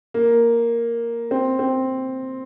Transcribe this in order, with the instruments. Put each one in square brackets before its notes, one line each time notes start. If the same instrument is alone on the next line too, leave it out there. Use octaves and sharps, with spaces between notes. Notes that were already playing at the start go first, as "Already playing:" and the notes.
[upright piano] A#3
C4
C4